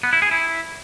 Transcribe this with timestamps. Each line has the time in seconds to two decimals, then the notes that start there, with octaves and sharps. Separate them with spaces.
0.03 B3
0.13 E4
0.22 G#4
0.31 E4